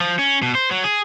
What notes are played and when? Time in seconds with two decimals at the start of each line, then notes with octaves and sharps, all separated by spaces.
0.01 F3
0.19 C#4
0.42 B2
0.55 C5
0.71 F#3
0.84 G#4